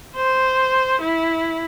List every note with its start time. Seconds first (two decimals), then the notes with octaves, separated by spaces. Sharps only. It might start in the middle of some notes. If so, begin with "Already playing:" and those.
0.15 C5
1.01 E4